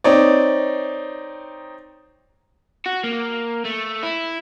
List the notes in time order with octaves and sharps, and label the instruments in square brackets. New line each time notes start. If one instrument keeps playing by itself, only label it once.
[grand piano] C4 D#4 C#5 D5
[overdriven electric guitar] F#4
A#3
A3
E4